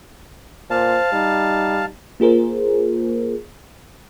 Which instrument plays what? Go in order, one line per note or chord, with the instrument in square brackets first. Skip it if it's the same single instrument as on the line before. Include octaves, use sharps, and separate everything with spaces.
[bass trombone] A#2 [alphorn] C5 [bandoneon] F5 A5
[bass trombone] G3 [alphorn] D#4
[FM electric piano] A#3 F4 G#4 A#4 C5